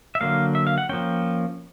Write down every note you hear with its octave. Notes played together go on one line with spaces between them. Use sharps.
E5
D3 F#3 A#3 F5
E5
F5
F#5
F3 A#3 C#4 G5